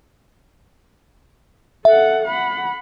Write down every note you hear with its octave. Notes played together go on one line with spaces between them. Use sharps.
A4 E5 F#5
F#5 B5